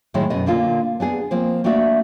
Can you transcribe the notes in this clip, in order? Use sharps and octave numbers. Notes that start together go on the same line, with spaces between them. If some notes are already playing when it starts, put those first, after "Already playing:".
A2 D#3 F#3 G#3 D#4 E4
F#2 B2 B3 D#5
A#2 D3 A#3 F4
B3 D4 G#4
F3 A#3 C4
A3 A#3 D4 F#4 D5 E5